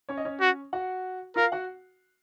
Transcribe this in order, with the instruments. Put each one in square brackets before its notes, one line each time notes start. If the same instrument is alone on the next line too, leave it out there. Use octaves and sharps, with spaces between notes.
[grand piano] C#4 C#5
D#5
C#4 C#5
[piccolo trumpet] F#4
[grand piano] F#4 F#5
[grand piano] F4 F5 [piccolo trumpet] A#4
[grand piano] F#4 F#5